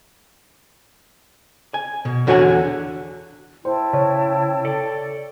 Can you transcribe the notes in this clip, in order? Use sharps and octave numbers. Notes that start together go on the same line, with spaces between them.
G#5
B2
E2 D3 F#4 C#5 E5 G#5
E4 C5 G5 A5
C#3 C#5
A4 D5